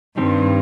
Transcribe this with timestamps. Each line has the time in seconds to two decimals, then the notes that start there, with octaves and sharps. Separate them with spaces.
0.17 G2 D#3 G3 C4 G4